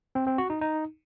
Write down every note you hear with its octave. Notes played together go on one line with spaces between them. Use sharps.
C4
C4
F#4
D#4
D#4